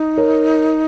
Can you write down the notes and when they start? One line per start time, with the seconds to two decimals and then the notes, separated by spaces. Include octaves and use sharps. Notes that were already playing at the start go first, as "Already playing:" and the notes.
Already playing: D#4
0.17 A#4 C#5